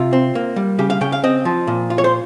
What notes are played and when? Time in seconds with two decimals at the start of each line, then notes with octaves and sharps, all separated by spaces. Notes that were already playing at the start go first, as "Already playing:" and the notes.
Already playing: C3 F4
0.13 C4
0.35 A#3
0.56 G3
0.79 C#3 G4
0.90 F5
1.01 C#3 G5
1.12 F5
1.24 C4 D#5
1.45 F3
1.67 A#2
1.90 F4
1.98 C#5
2.04 C5